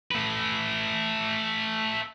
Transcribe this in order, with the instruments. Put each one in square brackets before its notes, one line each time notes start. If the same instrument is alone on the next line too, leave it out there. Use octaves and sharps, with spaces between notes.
[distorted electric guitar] A3 B4